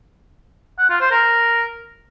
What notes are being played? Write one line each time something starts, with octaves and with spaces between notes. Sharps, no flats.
F#5
F4
C5
A#4